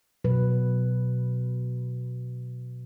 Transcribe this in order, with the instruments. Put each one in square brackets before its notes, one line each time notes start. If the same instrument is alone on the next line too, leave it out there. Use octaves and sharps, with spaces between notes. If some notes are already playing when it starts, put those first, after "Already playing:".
[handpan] B2 F#3 B4